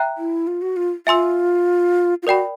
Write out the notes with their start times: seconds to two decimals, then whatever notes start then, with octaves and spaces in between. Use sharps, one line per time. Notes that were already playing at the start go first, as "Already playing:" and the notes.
Already playing: E5 G5 A#5 F#6
0.18 E4
0.47 F4
0.62 F#4
0.76 F4
1.06 F4 E5 G#5 C6 E6
2.23 F4
2.27 F#4 A#4 D5 G5 B5